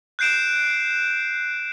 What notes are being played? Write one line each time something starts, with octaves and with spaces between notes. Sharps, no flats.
F#6 G6 C7 D7 E7